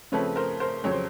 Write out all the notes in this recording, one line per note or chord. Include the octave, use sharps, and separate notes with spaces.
C#3 F3 A3 C4 B4 C#5
A#4 C5
A#4 C5
F2 C#3 F#3 C#5
C5